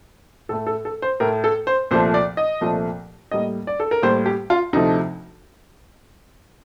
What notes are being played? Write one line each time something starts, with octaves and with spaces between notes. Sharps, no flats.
A2 A3 A4
A4
A4
C5
A2 A3 A#4
A4
C5
C2 A#2 F3 A3 C5
D5
D#5
C2 A#2 F3 A3
A2 G3 A#3 D#5
D5
A4
A#4
A2 G3 A#3 C5
G4
F4
D2 C3 F3 A3 D#4